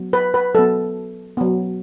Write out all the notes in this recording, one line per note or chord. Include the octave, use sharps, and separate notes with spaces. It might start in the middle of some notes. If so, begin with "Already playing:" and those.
Already playing: F#3 B3
B4
B4
F#3 B3 A4
F#3 B3